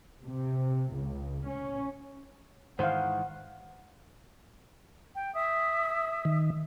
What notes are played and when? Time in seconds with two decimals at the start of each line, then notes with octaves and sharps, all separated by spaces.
0.22 C3
0.92 C#2
1.47 C#4
2.79 G#2 D#3 E3 C5 F5 F#5
5.15 G5
5.34 E5 D#6
6.25 D#3